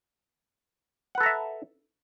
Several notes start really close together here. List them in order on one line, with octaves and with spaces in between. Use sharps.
F#5 B4 A4 A#5 E5